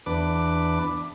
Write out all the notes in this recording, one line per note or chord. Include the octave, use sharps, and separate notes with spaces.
E2 D4 B4 D6